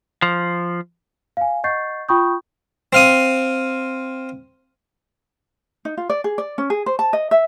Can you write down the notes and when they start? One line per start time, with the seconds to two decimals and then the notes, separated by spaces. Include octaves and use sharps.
0.22 F3
1.37 F5 G#5
1.64 D#5 F#5 C#6 G6 A6 C7
2.09 F4 G5 B5 C#6 D#6 G6
2.93 C4 F5 D#6
5.85 D#4
5.97 F4
6.10 D5
6.24 G#4
6.38 D5
6.58 C#4
6.70 G#4
6.86 C5
6.99 A5
7.13 D#5
7.31 E5